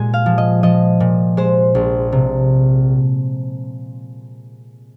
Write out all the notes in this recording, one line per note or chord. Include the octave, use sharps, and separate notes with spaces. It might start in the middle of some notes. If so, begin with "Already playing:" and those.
Already playing: A#2 G#3 G#5
F5
F3
D#5
F3 D#5
A#2
G#3 C5
A#1
C3